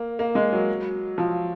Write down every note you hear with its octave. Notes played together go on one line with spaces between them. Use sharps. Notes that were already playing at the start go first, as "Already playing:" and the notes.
Already playing: A#3
A#3
G#3
F#3
F3